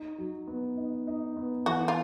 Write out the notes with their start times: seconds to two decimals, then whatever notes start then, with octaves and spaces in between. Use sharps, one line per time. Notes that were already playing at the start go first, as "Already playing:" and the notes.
Already playing: D#4
0.18 F#3
0.47 B3
0.77 D#4
1.07 D#4
1.37 B3
1.66 E3 F#4
1.88 F4